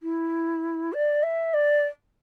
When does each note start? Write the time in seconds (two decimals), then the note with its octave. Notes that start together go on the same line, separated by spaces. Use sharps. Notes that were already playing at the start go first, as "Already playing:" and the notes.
0.02 E4
0.93 D5
1.23 E5
1.53 D5